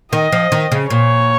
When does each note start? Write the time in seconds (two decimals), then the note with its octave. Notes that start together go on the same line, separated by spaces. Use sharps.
0.13 D#3 D#5
0.32 F3
0.52 D#3
0.72 C#3
0.90 A#2 C#5